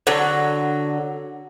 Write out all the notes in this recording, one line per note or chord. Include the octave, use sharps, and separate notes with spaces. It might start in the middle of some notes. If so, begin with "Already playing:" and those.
D3 F#3